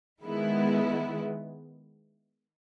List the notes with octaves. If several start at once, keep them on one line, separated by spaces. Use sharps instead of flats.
D#3 G#3 B3 E4